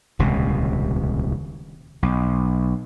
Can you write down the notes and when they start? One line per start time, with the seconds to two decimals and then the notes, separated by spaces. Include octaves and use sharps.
0.19 D#1 C#2 C3
2.03 B1